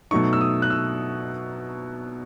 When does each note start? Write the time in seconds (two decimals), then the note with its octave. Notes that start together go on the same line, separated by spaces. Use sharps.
0.11 B2 F#3 A3 D#4 C#6
0.33 E6
0.41 D#6
0.62 F#6
0.70 E6